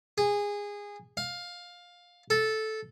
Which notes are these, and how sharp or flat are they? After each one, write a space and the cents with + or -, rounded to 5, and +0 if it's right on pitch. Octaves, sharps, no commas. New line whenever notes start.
G#4 -20
F5 +15
A4 -10